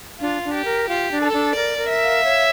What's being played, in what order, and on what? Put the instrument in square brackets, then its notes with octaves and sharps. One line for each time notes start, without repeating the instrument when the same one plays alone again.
[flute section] D4 [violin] F4
[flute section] D4
[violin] G4
[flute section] A#4
[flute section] F4 [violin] G4
[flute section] D4
[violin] A4
[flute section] D4
[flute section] A#4 [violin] D5
[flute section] A#4
[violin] E5
[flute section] F5
C#5